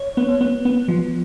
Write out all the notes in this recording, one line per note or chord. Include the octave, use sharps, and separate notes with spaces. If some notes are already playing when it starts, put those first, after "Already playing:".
Already playing: C#5
B3
B3
B3
F3